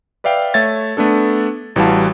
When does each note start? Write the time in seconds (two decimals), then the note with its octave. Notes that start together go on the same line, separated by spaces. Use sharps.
0.24 B4 D5 E5 F5 G5
0.54 A3 C#5 E5 G#6 A6
0.97 A3 B3 D4 A4
1.76 A1 E3 G3 F#4 F5 A5